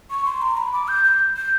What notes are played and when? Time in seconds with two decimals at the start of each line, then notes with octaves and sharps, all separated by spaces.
0.10 C#6
0.26 C6
0.42 A#5
0.57 B5
0.73 D6
0.88 G6
1.04 G6
1.37 G6